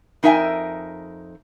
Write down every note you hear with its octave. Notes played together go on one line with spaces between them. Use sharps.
F2 D#4 A#4 E5 G5 G#5